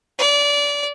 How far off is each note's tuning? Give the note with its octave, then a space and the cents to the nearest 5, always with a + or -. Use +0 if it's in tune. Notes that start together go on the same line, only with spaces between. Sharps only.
D5 -25